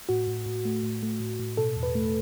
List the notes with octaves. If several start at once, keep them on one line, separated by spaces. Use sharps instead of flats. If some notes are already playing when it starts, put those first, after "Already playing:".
A2 F#4
A2
A2
A3
A2
A3
A2
A2
B2 A4
E2
B4
A3